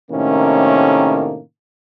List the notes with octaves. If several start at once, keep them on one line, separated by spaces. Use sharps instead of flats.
A2 C3 D#3 A3 A#3 C#4